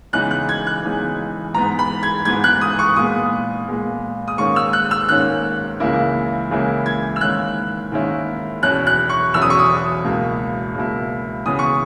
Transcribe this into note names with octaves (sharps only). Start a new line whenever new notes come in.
C#3 E3 G#3 B3 D#4 F#6
F#6
G#6
F#6
C#3 E3 G#3 B3 D#4
G#2 E3 B3 A#5
B5
G#6
G#2 E3 B3 G#6
F#6
D#6
C#6
A#2 G#3 B3 D#6
A#2 G#3 B3
D#6
G#2 D#3 A#3 C#4 C#6
E6
F#6
E6
G#2 D#3 A#3 C#4 F#6
C#2 C#3 E3 A#3 E4
C#2 C#3 E3 A#3 E4
G#6
E6
G#2 D#3 A#3 C#4 E4 F#6
G#2 D#3 A#3 C#4 E4
E2 B2 F#3 C#4 E4 F#6
F#6
C#6
E2 B2 F#3 C#4 E4 E6
D#6
C#6
D#6
C#2 B2 A#3 E4
C#2 B2 A#3 E4
C#3 E3 B3 D#6
C#6